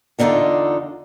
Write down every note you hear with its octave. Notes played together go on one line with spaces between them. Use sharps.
E2 D3 C4 D#4 F4 D5